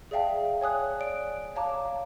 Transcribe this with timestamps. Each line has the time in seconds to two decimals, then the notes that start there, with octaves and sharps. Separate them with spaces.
0.11 G#4 D5 E5 F5 G5 A5
0.61 C#5 G#5 D#6 F#6
1.00 D5 D7
1.55 C#5 F5 A5 A#5 D6